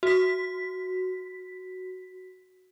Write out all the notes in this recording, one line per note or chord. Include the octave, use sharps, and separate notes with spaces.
F#4 B6